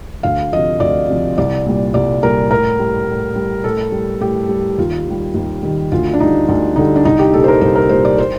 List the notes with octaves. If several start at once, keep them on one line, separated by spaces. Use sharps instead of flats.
D2 F5
C3 F3 D#5
D2 D5
C3 F3
C2 D5
A#2 G3
C2 D5
A#2 G3 A#4
A2 A#4
G3
A2
G3
A2 A4
G3
A2 G4
G3
D#2 F4
D#3 G3
D#2
D#3 G3
D2 F4
D4
D3 G3 D#4
D2 D4
D3 G3 D#4
D4
C2 D#4
G4
A#2 G3 A4
C5
A#4
C2 C5
A#4
A#2 G3 C5
D5
C5